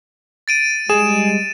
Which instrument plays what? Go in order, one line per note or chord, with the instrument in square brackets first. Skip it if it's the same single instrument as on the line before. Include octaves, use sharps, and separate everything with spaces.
[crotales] A6 D7 D#7
[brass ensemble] G3 G#3 [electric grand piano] G#4 [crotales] E7